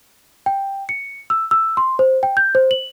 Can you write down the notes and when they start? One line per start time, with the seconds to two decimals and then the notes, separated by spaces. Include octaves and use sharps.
0.46 G5
0.89 C#7
1.30 E6
1.51 E6
1.77 C6
1.99 C5
2.23 G5
2.37 G6
2.55 C5
2.71 F#7